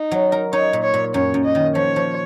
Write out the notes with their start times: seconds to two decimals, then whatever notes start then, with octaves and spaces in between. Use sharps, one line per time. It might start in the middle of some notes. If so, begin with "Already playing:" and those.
Already playing: D#4
0.11 F#3
0.32 A#4
0.53 D#4 C#5
0.73 A#2
0.83 C#5
0.94 A#2
1.14 F#2 C#5
1.34 F#2
1.45 D#5
1.55 D#3
1.75 F3 C#5
1.96 F3